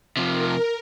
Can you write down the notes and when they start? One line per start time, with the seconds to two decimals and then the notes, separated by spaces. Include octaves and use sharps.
0.17 C3 F3 A#4